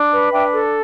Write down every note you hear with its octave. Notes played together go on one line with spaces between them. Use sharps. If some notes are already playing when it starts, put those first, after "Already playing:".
Already playing: D4
B4
D4 E5 G5
A4